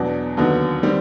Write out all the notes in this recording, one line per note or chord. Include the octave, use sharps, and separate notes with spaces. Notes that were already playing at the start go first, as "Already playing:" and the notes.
Already playing: E2 B2 F#3 B3 D4
D#2 D3 F#3 B3 D#4
D#3 G3 C4